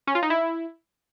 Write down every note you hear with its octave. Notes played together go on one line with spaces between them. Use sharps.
C#4
F4
D#4
E4